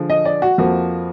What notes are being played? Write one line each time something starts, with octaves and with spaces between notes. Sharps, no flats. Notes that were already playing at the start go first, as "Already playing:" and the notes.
Already playing: D3 F3 G#3
D#5
D5
F#4
F2 F3 A#3 F#4